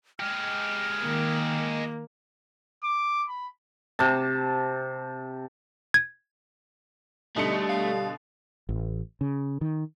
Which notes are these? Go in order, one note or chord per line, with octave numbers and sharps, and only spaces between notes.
G#3 G4 F6
D#3 A#3
D6
B5
C3 A5
G#6
B2 D3 G3 A3 D#4 C#7
F5
A1
C#3
D#3